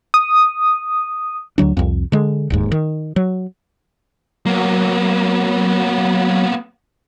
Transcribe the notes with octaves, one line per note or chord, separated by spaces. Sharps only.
D#6
D2 D3 F#3 D4
C2 F2
D3 G#3
D1 D#2 G#2
D#3
F#3
F#3 A#3 B3